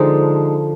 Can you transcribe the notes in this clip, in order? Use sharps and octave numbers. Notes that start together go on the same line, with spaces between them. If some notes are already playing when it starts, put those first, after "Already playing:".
Already playing: D3 F3 G#3 D#4